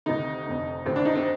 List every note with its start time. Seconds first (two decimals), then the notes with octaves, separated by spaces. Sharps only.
0.06 D2 C3 D#3 D#4
0.46 F1 F2 D3
0.86 D2 C3 D#3 C4
0.96 D4
1.05 D#4
1.15 C4